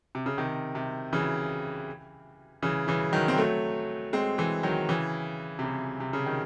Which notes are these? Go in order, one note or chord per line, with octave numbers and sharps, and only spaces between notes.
C3
C#3
C3 D#3
C3
C#3 E3
C#3 E3
C#3 E3
D#3 F#3
C4
F#3 A3
G#3 C4
E3 G#3
D#3 F#3
C#3 E3
C3
C#3
C3
C#3
D#3